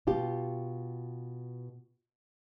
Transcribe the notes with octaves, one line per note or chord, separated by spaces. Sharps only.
B2 F4 G4